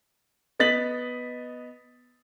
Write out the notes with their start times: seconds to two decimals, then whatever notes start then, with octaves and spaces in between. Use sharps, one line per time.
0.60 B3 D#5 A6 B6 F#7